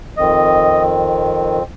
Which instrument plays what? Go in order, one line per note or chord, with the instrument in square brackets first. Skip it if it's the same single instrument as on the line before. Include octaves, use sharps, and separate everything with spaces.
[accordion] F2 D#3 C4 D#5